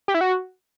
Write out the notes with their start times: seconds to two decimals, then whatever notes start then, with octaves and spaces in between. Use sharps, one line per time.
0.08 G4
0.14 E4
0.21 F#4